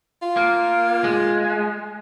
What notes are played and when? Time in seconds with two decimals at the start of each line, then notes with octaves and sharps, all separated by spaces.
0.22 F4
0.37 A#3
1.04 G#3